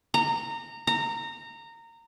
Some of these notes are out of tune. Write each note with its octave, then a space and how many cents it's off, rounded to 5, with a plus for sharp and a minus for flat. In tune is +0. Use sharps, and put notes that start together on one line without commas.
A#5 -20
A#5 -20